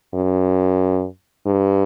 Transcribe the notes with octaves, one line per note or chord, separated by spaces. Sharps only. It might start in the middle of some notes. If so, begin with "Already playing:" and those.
F#2
G2